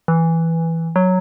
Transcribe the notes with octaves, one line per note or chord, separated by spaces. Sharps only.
E3
F#3